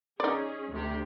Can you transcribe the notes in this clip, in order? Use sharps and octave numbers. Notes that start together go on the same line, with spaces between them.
C#4 D#4 G#4 D5
D2 C3 G4